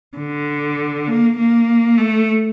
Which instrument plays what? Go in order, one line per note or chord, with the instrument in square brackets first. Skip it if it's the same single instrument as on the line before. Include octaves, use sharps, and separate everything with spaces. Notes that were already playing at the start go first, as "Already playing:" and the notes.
[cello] D3
A#3
A#3
A3